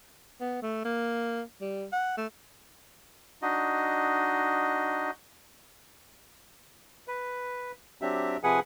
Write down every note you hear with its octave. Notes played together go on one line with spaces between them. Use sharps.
B3
A3
A#3
G3
F#5
A3
D4 D#4 F#4 D#5
B4
F#3 C4 D4 G4 E5
C3 F3 G#4 B4 F#5 G#5